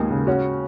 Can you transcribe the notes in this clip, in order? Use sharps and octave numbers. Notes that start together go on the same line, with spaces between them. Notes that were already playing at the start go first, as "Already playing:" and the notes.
Already playing: D#2 A#2 G#3 G#4
C#3
C#4 F#4